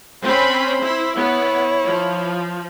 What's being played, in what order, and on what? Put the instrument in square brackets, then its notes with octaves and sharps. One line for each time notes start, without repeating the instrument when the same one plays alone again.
[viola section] C4 C#4 B5 [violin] C5
[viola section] E4
[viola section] B3 [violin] E4 C#5
[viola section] F3